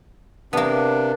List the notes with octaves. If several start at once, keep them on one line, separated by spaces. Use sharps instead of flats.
C3 A#3 B3 D4